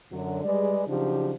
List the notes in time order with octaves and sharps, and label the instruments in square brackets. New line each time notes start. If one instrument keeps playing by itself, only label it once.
[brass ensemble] F#2 D3 F#3
G3 G#3 G#4 B4 D5
C#3 F3 F#3 D4 D#4 G4